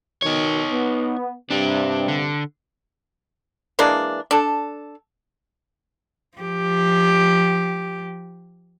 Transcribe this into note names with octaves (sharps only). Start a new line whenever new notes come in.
B2 D#3 D#4 C#5
B3
G2 C3 D4 G4
D3
E3 G#3 A#3 D4
D4 A4
F3 G4